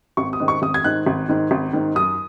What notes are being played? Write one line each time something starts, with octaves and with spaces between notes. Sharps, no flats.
G#1 C#6
D#6
G#2 D#3
C#6
G#1 D#6
G#6
G#2 D#3 F#6
G#1
G#2 D#3
G#1
G#2 D#3
F#2 D#6